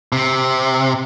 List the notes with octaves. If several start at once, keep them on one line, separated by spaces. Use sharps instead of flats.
C3